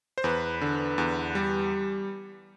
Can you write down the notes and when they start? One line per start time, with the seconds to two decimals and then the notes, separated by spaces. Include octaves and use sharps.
0.18 C5
0.24 E2 B4
0.61 D3
0.98 E2
1.35 G3